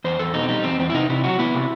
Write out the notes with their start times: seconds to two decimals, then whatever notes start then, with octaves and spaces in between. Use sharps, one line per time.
0.04 E2 C5
0.19 E2 A4
0.34 B2 D#4
0.43 C4
0.49 G3 D#4
0.64 E2 C4
0.79 E2 C4
0.90 E4
0.94 C3 D#4
1.09 C3 E4
1.24 F#3 F#4
1.39 B3 E4
1.54 C3